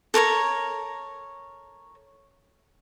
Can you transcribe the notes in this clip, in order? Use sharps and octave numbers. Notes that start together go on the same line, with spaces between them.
A4 A#4 C#5 A#5